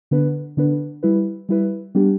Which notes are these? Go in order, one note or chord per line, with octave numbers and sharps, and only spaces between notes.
D3 B3 D4 B4
D3 B3 D4 B4
G3 E4 B4
G3 E4 B4
G3 B3 D4 G4